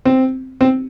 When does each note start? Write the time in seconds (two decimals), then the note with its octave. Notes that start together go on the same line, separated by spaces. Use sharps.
0.06 C4
0.61 C4